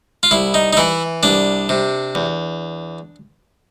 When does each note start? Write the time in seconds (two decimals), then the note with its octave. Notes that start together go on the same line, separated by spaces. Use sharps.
0.23 F4
0.31 C2 E4
0.54 D#4
0.73 D#4
0.77 E3 E4
1.23 C2 D4
1.69 C3
2.15 E2